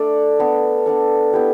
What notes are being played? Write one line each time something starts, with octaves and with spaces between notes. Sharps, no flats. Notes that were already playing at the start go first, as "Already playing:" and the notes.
Already playing: A3 D4 A4 D5
B3 D4 A4
B3 D4 A4
B3 E4 G4 B4